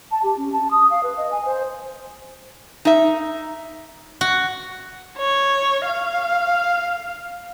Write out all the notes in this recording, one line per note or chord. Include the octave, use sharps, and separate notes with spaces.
A5
G4
C#4
A5
D#6
F5
B4
D#5
G#5
C5
D#4 E5
F#4
C#5
F5